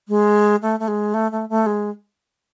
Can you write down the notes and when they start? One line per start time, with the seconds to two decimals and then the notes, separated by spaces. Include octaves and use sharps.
0.08 G#3
0.62 A3
0.80 A3
0.88 G#3
1.14 A3
1.32 A3
1.49 A3
1.66 G#3